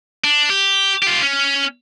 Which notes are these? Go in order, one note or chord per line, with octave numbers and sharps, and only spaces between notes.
D4
G4
F4 G4
C#4